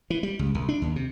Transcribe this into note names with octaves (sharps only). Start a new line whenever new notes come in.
E3
G3
C#2
C2
D4
D#2
C3